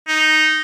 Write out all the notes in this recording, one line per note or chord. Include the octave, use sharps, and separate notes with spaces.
D#4